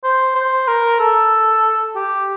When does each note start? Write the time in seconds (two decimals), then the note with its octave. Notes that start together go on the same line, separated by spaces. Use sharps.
0.04 C5
0.36 C5
0.68 A#4
1.00 A4
1.96 G4